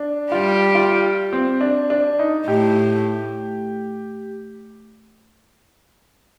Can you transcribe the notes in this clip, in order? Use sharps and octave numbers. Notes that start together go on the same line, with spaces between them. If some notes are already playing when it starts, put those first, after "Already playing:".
Already playing: D4
G3 F4 G4
F4
C4
D4
D4
D#4
A2 A3 G4